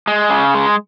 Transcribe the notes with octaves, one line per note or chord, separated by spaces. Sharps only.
G#3
C#3
G#3